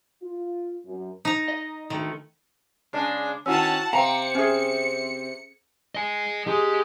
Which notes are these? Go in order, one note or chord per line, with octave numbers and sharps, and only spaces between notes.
F4
F#2
D#4 A#5
D#5
D3 D#3 A3
C#3 G#3 D4
D#3 C#4 E4 F#4 F#5 A5 E6
C3 C4 F5 G5 A#5 C#7
C#4 G#4 C5 E5
D#5 G#5
G#3 G4